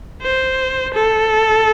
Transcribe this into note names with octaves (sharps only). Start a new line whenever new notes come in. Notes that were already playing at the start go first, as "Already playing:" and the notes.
C5
A4